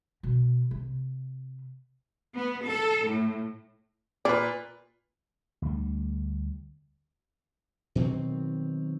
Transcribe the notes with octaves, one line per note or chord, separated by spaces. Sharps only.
B2 D3
C3
B3
A4
A2
A#2 B4 D5
D2 G3
B2 D#3 F#3 C4